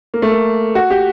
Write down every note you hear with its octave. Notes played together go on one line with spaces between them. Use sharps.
A#3
A3
A#3
F#4
G4